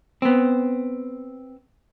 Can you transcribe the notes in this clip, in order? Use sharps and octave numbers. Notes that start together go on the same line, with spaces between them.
B3 C4